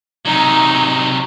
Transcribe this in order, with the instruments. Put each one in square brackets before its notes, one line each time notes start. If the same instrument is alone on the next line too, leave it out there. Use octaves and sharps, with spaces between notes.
[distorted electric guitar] C3 F#3 [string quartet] D#4